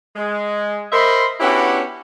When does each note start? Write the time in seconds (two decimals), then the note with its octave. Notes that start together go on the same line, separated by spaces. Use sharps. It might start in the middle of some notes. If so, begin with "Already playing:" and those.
0.16 G#3
0.92 A#4 C5 D#5 E5 B5 C6
1.40 B3 C#4 D4 E4 F#4 G4